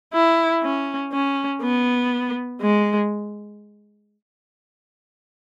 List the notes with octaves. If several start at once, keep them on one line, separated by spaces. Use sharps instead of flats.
E4
C#4
C#4
B3
G#3